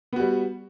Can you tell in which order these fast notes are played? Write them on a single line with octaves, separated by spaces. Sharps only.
B3 F#4 G3